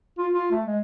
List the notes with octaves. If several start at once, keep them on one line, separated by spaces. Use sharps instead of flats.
F4
F4
A3
G#3